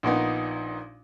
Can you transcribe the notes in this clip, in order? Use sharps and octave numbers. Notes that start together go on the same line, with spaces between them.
A#1 A#2 B3 D#4